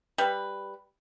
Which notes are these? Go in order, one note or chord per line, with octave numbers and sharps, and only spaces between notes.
G3 B4